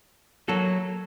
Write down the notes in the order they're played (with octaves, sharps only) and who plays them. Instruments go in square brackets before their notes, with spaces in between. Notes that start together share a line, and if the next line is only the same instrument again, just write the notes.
[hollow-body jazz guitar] F#3 A#3 F#4 A4